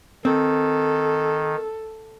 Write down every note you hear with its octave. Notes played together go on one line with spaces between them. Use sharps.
D#3 C4 A4